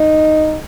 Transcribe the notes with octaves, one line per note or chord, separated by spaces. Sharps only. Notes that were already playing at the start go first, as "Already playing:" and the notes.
Already playing: D#4